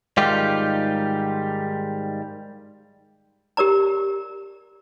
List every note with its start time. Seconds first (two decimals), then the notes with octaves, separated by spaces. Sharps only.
0.17 G#2 D#3 G3 F4 G4
3.57 G4 A#4 D5 A#5